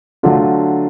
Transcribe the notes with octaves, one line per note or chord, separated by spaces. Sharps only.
D3 F#3 A3 D4 F4